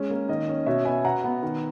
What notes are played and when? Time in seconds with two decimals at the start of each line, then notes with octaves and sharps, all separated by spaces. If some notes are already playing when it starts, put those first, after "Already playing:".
Already playing: G#3 C#4
0.10 A#3
0.29 D#3 D#5
0.47 C#4
0.66 B2 C#5 E5
0.85 B3 E5 G#5
1.04 B2 F#5 A#5
1.24 B3
1.42 D#3